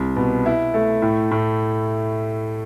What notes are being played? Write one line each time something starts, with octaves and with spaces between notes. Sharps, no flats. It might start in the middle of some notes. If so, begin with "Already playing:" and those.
Already playing: C2
B2
E4
A3
A2
A2